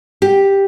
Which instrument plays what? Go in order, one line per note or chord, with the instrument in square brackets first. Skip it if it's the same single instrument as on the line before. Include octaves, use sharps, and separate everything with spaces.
[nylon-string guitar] G4